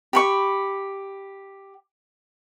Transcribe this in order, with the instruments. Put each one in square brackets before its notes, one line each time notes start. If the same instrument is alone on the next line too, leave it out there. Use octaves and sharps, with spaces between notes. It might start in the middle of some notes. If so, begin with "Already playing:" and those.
[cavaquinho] G4 B5 C#6